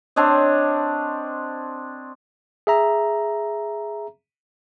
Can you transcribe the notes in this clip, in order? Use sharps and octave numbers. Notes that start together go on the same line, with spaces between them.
C4 D4 C#5 D#5
G#4 E5 A#5